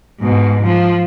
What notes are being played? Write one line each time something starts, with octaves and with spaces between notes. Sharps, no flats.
G#2 B2
F3